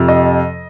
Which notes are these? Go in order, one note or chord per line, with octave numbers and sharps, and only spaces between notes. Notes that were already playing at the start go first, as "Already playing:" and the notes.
Already playing: F2 C3 F3
D#5